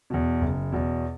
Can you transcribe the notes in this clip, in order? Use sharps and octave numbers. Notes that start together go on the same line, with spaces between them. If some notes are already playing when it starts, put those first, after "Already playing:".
E2 B2
F#1
E2 B2